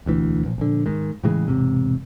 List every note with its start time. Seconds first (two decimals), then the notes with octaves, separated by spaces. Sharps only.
0.06 E1 D2 E3
0.45 A#1
0.58 A#1 D3
0.86 G#2 D#3
1.24 A2 C#3 E3 G#3
1.48 E1 G#2 C3